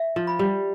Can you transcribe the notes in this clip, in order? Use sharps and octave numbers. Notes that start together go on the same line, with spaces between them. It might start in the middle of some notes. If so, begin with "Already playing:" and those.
Already playing: E5
F3
B5
G3